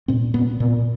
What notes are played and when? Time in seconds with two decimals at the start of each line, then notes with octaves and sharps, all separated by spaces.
0.08 A#2 C4
0.34 A#2 B3
0.60 A#2